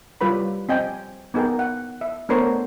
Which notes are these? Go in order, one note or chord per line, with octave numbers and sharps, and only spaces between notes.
G3 F4 G4 B4 C#5 B5
C4 D#5 G5 G#5
B3 D#4 G#4 A#4 G5
F#5
E5
A3 B3 D4 A#4 C5 C#5